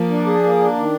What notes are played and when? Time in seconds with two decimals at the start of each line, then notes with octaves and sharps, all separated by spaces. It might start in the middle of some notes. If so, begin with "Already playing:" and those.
Already playing: F3 A#3
0.10 D4
0.26 G#4
0.44 A#3
0.60 D4
0.76 D#3